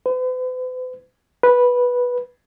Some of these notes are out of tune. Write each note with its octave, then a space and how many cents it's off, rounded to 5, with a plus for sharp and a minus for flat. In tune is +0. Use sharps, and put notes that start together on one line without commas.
B4 +45
B4 -10